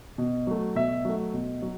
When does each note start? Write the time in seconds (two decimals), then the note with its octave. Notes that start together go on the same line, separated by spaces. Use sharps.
0.18 B2
0.47 F#3 A3
0.75 B2 E5
1.05 F#3 A3
1.34 B2
1.62 F#3